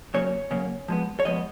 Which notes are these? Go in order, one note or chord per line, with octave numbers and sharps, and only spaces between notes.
C#3 F#3 A#3 C#4 C#5
C#3 F#3 A#3 C#4
F3 G#3 B3
C#5
F3 G#3 B3 D#5